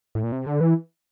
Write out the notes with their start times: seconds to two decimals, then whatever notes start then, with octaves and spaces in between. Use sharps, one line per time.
0.15 A2
0.24 A#2
0.32 C3
0.47 D3
0.61 E3